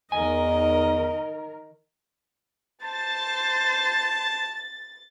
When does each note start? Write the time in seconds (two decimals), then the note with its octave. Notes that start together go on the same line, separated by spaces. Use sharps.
0.12 E2 D#3 A#4 D#5 G#5
2.84 C5 A5 A6